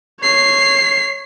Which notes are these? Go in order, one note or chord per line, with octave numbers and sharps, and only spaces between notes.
C#5 C7